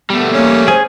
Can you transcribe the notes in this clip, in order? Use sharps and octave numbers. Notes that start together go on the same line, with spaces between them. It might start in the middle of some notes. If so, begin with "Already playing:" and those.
G3 A3 B3
A#3 C#4
G#4 C5